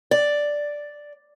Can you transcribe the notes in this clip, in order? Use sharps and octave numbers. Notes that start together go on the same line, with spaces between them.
D5